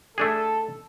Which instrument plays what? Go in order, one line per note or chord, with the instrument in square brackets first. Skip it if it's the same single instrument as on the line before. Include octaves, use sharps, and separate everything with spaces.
[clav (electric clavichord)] A3 D4 G#4 [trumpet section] A4